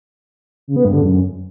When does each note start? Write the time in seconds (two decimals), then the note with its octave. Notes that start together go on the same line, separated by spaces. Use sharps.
0.68 C#3
0.76 B3
0.85 G2
0.94 D3
1.02 F#2